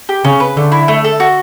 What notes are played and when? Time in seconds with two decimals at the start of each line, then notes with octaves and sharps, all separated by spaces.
0.09 G4
0.25 C#3 C#4
0.40 B4
0.57 D3 A3
0.72 E4
0.88 A3
1.04 A4
1.20 F#4